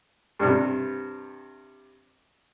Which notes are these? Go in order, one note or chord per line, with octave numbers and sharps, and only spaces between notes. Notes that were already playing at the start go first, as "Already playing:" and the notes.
G2 C3